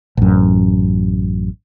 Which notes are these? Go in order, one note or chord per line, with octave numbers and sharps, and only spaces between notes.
A1 F#2